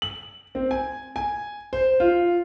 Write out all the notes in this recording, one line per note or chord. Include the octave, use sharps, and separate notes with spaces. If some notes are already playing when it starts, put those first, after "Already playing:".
F#7
C4
G#5
G#5
C5
F4